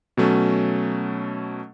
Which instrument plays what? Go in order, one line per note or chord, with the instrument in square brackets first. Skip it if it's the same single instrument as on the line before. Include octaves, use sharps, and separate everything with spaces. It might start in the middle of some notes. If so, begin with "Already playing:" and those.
[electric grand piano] B2 F#3 A3 C#4